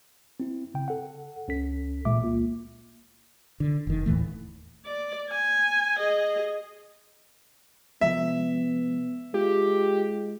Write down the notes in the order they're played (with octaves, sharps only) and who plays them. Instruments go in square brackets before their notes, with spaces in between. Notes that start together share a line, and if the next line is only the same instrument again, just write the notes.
[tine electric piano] C4 E4
C#3 G5
A4 F#5
C#2 C#4 A4 B6
A1 A#2 G#3 E5 D6
C#2 A#3 F4
[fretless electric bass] D3
F1 D#3
D#2 A2 E3 A3
[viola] D5
G#5
G#4 D#5
[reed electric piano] C3 F3 G#3 [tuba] B3 [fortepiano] E5
[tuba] G#3 [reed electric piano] F4 [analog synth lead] G4